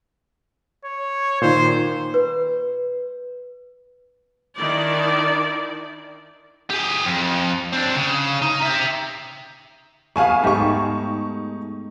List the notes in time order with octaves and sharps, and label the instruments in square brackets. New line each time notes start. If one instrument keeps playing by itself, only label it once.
[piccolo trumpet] C#5
[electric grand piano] A#2 D#3 [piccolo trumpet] C5
[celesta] B4
[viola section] D#3 D4 E4 D5
[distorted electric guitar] G4 G#4
F2
C4 D4
C#3
D#4
G4 E5
[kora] A3 B3 G#4 [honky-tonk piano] F5 G#5 C#6
[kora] G#2 A3 G4 [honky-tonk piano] D#4 C#6